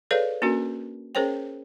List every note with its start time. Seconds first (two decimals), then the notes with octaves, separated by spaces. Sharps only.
0.11 G#4 A4 B4 C#5 D5 F5
0.42 A#3 C#4 D4 F#4 A#4
1.15 C#4 G#4 A#4 C5 C#5 G5